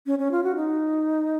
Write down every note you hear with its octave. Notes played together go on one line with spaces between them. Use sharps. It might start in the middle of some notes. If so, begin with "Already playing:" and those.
C#4
C#4
F4
F#4
D#4